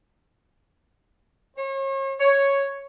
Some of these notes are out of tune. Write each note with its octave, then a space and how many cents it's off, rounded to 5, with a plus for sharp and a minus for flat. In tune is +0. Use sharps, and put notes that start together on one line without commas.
C#5 -40
C#5 +0